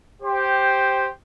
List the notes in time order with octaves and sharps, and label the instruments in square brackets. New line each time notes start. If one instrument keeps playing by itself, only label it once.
[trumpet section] G4 C5